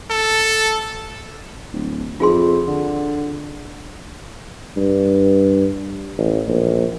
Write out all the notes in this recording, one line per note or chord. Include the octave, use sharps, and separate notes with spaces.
A4
D1
F2 F4 G#4 C6
D3
G2
A1
A#1